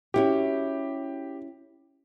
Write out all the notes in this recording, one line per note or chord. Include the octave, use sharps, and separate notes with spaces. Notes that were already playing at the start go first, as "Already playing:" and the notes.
C#4 E4 F#4 G4